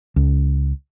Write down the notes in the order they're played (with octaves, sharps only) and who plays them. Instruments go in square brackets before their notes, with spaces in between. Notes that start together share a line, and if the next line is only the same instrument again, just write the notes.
[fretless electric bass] C#2